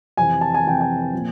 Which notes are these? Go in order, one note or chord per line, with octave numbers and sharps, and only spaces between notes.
F2 C3 E3 G#5
A5
G#5
F2 C3 E3 G5
G#5
A#2 F3